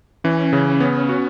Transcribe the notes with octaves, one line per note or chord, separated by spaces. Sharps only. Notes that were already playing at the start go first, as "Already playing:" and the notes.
E3 C#4
C#3
B3
F#4